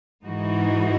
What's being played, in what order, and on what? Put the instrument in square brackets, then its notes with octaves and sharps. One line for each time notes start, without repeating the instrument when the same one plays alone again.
[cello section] G#2 E3 G#3 D#4 F#4